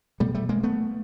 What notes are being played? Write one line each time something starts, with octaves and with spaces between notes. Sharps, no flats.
B2 G3 A3
G3 A3
G#3 A#3
A3 B3